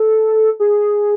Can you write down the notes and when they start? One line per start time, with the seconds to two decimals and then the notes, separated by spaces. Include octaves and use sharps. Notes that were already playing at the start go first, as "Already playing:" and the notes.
Already playing: A4
0.60 G#4